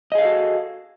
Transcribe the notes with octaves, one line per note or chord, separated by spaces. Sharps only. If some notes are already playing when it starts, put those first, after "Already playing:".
F#4 G#4 A4 D#5 F5